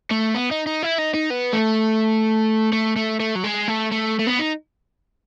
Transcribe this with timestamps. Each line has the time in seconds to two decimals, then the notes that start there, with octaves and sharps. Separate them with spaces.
0.11 A3
0.35 B3
0.51 D#4
0.66 D#4
0.83 E4
0.98 D#4
1.14 D#4
1.31 B3
1.53 A3
2.73 A3
2.96 A3
3.20 A3
3.36 F#3
3.44 G#3
3.68 A3
3.91 A3
4.19 A3
4.27 B3
4.39 D#4